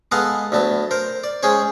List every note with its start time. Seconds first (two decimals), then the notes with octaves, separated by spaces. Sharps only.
0.12 G#3 B3 A4 D#5 F5 F#5
0.52 D2 F#3 B3 A5
0.91 A#4 C5
1.24 D5
1.43 G#3 C#4 G#4 C5 C#5